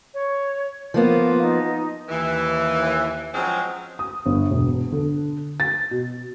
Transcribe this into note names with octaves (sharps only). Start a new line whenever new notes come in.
C#5
F3 A#3 B3 F4
D#4
D#2 E3
F3 F#3 G#3 C4 C#4
D#6
G1
E1
D3
A6
B2